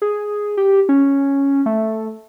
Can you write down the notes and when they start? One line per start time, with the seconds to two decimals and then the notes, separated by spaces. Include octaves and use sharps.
0.02 G#4
0.57 G4
0.89 C#4
1.66 A3